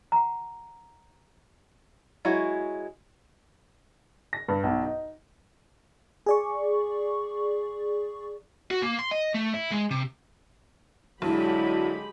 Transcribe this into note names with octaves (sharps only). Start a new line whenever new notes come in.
F#5 A#5
F#3 G#3 E4 F#4
A#6
G2
B1
D#4
G#4 D5 C#6
F#4
A#3
C6
D#5
A3
E4
G#3
C3
B1 D3 F#3 G#3 E4 G4 B5